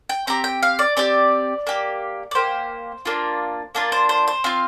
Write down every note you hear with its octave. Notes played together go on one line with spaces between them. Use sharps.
G5
C4 G4 A#5
G5
F5
D5
C4 G4 D5
A#3 G4
D5
A#3 G4 C5
A#3 D4 F4
A#3 D4 F4 A#4
C5
C5
C5
C4 F4 F5